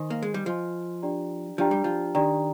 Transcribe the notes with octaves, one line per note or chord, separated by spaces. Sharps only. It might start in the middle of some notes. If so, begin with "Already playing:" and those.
Already playing: D#3 C5 D#5 G#5 C6
A#3
G#3
G3
F3 C5 D#5 G#5 C6
D4 G4 D5 G5 A#5
F3 D4 G4 D5 G5 A#5
G3
F3
D#3 D4 G4 D5 G5 A#5